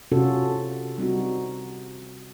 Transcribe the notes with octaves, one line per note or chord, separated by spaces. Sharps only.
C3 C#4 F4 F#4 A4
G3 C4 D#4 F#4